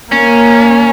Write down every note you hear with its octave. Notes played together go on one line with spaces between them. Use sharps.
A#3 C#4